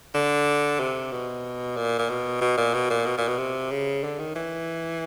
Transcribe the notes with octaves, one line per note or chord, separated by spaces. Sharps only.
D3
C3
B2
A#2
A#2
B2
B2
A#2
B2
A#2
B2
A#2
B2
C3
C#3
D3
D#3
E3